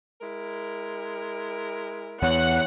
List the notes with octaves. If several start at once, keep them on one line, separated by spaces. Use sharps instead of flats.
G#3 E4 A#4
E2 C#5 F#5